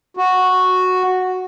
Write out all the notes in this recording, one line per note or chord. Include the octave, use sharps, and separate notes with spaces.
F#4